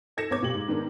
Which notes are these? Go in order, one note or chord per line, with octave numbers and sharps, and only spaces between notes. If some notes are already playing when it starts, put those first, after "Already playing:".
D#4 A4 G#6 A#6 C#7 E7
G#1 B3 C#5 D6 G#6
A#2 G4 F#7
G#2
G#2 D#3 B3 D4 A#4